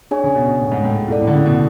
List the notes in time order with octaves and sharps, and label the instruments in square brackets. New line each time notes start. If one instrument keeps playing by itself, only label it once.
[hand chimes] D4 G#4 C#5 G#5
[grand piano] C#3
B2
B2
A2
G#2
A2
[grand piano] G#2 [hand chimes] E4 A4 D5
[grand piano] A2
D3
C#3
B2